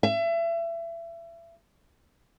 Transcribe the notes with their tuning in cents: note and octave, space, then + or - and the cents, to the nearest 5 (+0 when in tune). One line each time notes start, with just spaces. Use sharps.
E5 +30